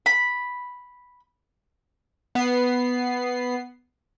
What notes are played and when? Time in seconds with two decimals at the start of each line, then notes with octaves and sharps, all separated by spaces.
0.06 B5
2.35 B3 C7